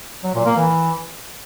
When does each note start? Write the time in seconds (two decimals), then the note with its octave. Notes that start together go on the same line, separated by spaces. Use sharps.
0.24 F#3
0.35 A#2
0.46 A#3
0.57 E3